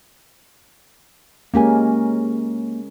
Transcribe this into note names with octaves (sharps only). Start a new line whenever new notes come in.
G#3 A#3 C#4 G4 A#4 G#5